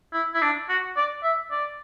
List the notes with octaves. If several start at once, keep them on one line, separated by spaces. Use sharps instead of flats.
E4
E4
D4
F#4
D5
E5
D5